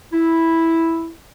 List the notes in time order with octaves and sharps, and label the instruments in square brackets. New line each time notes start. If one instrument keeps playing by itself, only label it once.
[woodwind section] E4